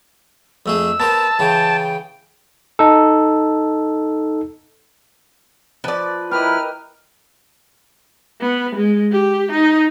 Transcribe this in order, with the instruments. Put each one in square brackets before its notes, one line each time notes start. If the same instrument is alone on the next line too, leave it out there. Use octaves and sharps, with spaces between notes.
[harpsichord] F2 A3 G#4 [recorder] E6
[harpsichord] B3 A#4 C5 [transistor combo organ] A5
[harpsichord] C#3 E3 [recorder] G5
[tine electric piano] D#4 A4
[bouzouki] F3 D5 [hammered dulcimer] B4
[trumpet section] E4 B4 [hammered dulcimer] G4 A#4 D#5 [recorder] F6
[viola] B3
G#3
G4
D#4